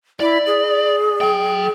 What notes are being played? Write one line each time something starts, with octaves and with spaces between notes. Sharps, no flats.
E4 D5
G#4
F#3 G5